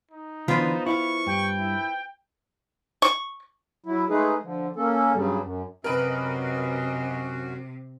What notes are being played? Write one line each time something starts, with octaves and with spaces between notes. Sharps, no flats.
D#4
D3 E3 B3 D4 F4 C5
E4 E5 F5 C#6
G2 G5
E4
C#6
F#3 E4
G#3 A3 D#4 G#4 B4
D3 F3
A#3 C#4 A4
G2 C#3 F#3 G3
F#2
F#2 C3 C#4 F#4 A#4 B4 D#5